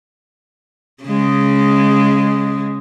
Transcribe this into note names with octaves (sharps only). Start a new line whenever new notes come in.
C#3 G#3